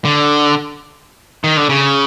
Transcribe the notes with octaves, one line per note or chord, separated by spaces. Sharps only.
D3
D#3
D3
C#3